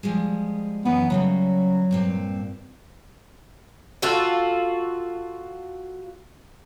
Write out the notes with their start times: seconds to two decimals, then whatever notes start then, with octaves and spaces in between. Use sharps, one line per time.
0.03 F3 G3 G#3
0.85 F#2 E3 B3 D#4
1.10 C#3 F#3 G3 A3
1.91 G2 A#2 C4
4.02 F4 F#4 A4